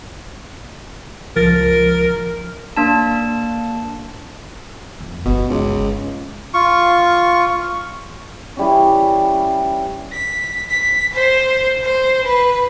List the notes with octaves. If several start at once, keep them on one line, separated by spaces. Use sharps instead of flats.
C#2 F3 A#4 A6
A#3 D4 A5
F2
G1 G2 B2
C#2
F4 C#6
E3 G3 C#4
B6
B6
C5
C5
B4